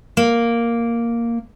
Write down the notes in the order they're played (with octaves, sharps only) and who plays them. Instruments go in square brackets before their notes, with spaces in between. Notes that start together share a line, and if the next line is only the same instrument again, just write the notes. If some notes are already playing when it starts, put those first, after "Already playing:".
[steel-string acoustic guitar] A#3